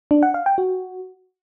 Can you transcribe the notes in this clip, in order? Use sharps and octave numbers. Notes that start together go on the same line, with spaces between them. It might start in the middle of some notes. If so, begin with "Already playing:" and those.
D4
F#5
F5
G5
F#4